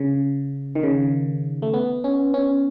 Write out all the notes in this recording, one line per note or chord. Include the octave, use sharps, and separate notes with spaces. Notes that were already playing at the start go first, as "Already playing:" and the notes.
Already playing: C#3
D#3
C#3
A3
B3
C#4
C#4